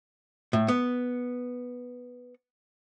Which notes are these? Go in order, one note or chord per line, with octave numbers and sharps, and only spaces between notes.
A2
B3